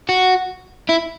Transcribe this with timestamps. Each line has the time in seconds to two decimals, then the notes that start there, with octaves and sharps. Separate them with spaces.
0.09 F#4
0.89 E4